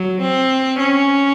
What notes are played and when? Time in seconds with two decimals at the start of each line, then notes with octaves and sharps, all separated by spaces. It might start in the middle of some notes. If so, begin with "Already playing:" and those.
Already playing: F#3
0.22 C4
0.80 C#4